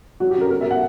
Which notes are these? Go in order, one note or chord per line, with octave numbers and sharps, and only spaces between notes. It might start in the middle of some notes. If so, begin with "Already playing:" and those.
F#3 F#4
G4
C#4 A#4
B3 A#4
F#3 E5
F#5